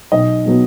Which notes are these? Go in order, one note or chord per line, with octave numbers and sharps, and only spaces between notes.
B1 D#5
B2 F#3 B3